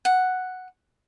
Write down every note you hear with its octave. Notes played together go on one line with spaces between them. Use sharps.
F#5